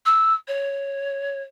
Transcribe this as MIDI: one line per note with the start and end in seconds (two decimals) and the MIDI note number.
0.06 0.33 88
0.48 1.42 73